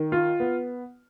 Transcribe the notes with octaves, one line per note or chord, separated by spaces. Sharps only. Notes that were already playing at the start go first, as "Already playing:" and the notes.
Already playing: D#3
F4
B3